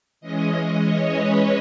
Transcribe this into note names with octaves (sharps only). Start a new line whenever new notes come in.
E3 G#3 C#4 D#5
D#5
C#5
B4